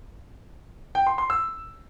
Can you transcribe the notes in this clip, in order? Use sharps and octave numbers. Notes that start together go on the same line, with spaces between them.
G5
C6
C6
E6